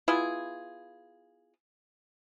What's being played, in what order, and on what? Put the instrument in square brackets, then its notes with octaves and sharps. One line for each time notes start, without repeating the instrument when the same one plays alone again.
[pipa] B3 E4 F4 G#4